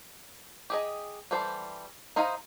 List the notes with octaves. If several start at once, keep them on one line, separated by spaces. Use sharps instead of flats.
G4 G#4 D#5
E3 G3 A4 C5
D#4 E4 C5 D#5 F5